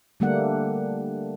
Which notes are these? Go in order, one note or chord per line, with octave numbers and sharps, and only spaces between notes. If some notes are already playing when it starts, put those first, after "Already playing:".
D3 G3 A3 A#3 D4 F#5